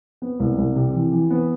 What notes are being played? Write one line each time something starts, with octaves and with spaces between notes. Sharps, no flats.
B3
C2
C2
C3
E3
E3
B3